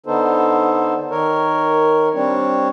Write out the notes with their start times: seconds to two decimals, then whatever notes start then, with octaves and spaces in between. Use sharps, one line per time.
0.06 D3 B3 D#4 A4 C5
1.11 D#3 A#4 C#5
2.14 G3 C4 D4 C#5